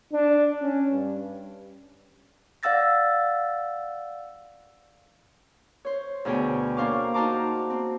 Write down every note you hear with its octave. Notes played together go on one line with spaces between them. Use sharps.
D4
C#4
G2
D5 F5 F#5 E6 A6 A#6
C5 C#5
D2 B2 G#4 C#5 G5
A#3 D4 C5 F5 C#6 D6
D#4 F#4 C5 A5 A#5 D6
C4